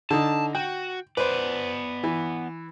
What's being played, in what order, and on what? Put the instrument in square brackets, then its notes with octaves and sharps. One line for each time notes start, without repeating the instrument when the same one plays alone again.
[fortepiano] D3 D#4 [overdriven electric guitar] A5
[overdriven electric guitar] F#4 [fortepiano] G5
[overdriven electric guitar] B3 D5 [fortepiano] B4 C5
[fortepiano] E3